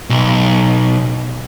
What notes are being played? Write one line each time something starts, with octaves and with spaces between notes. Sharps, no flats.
B1